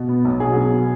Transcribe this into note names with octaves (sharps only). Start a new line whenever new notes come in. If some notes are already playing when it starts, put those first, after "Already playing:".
Already playing: B2
B3
B1
F#3 G#4
B2
B3